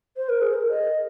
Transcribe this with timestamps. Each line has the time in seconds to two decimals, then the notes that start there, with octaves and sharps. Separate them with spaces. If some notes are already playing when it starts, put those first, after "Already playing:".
0.17 C5
0.29 A#4
0.41 G#4
0.54 A#4
0.70 D#5